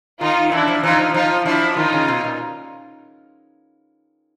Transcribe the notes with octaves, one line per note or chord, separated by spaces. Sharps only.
D#3 D#4 F4
E3 D4 E4
F3
E3 D#4 F4
F3
F3 D#4 F4
F3 D4 E4
D#3 D#4 F4
C#3
B2
A#2